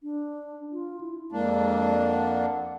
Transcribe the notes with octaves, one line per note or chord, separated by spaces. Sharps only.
D4
F4
E4
F2 G#3 A#3 D4
F#5